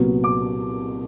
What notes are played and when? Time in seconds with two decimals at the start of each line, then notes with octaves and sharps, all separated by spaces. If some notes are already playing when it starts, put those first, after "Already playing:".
Already playing: C2 A#2 F#3 B3
0.24 D6